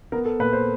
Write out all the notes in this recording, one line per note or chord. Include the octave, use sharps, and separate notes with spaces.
B3 A#4
A4
A#2 B4
C5